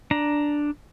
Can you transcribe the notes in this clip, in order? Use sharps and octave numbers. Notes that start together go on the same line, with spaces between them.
D4 A#5